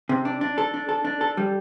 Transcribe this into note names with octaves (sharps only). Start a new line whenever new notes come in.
C3
D4
D4
A4
D4
A4
D4
A4
G3